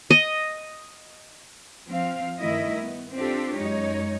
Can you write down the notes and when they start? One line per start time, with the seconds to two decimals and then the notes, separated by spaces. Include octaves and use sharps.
0.11 D#5
1.87 F3 C4 F5
2.39 G2 D#3 A3 E4 D#5 E5
2.81 B3
3.14 C4 D4 F4 G4 A4
3.57 F#2 G#3 D#4 C#5